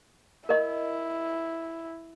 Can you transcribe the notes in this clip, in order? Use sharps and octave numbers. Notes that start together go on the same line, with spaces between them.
E4 A#4 D#5